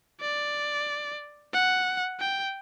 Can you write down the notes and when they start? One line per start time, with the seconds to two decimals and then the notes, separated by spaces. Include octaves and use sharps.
0.21 D5
1.53 F#5
2.20 G5